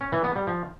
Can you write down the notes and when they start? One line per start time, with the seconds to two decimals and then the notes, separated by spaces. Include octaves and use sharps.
0.01 C#4
0.12 E3
0.24 B3
0.36 G3
0.47 F3